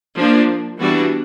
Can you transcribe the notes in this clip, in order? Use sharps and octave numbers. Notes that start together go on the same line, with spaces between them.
F3 A#3 D4
E3 G3 B3 D4 F#4